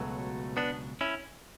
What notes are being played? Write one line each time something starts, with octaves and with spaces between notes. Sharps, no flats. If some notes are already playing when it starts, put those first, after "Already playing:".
Already playing: C#2 B2 F#3 A3
B3 D4
C#4 E4